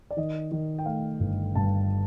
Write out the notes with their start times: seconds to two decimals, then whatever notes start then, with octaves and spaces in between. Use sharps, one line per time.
0.11 D5
0.17 D#3 D#5
0.52 D#3
0.79 G5
0.86 A3 F5
1.20 G1
1.55 G2 A5